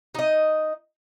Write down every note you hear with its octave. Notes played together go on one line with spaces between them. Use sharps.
D#4 D#5